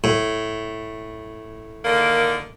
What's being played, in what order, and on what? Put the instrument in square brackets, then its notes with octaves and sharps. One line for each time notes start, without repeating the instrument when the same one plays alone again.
[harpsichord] A2
[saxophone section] D3 D#3 A#3